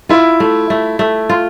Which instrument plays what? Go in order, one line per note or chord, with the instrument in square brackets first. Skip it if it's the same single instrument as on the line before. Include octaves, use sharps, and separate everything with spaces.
[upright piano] E4 [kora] F4
[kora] A3
A3
A3
F4